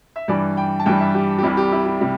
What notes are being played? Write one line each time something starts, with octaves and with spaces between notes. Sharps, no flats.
E5
G2 E3 G3 D5
G5
A5
G2 E3 G3 G5
E5
G4
G4
C2 C3 G3 E4
G4
E4
G4
C3 G3